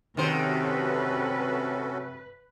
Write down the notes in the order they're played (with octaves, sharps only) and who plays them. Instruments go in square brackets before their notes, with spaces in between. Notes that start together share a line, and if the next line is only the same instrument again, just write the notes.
[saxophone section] C3 [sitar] D#3 C5 [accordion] C#4 F#4 A4 [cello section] B4